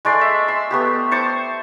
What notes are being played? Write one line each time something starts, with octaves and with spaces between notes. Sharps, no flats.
G#3 A3 D5 C6
E5
C6
A3 B3 G4
C5 A5 C#6 D6